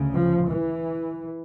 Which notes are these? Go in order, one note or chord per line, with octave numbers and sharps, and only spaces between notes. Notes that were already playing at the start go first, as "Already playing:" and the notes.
Already playing: D2 C#3
F3
E3